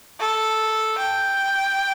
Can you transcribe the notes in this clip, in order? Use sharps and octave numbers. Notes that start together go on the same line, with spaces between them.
A4
G5